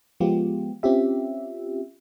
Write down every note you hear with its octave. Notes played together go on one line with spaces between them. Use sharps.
F3 G#3 B3 F4 G4
C4 C#4 F4 G4 E5